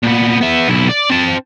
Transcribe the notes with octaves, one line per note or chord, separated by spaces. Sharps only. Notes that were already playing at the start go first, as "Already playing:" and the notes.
A#2 B3
B3 E5
B1 E4
D5
C4 A5